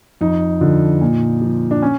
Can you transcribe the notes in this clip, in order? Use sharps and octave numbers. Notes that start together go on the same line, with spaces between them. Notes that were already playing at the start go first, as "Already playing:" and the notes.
F2 D#4
D3 F3
A#2
F3
D4
C#4